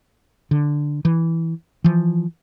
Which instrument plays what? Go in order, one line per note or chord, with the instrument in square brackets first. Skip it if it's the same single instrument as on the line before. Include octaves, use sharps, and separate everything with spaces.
[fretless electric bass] D3
E3
E3 F3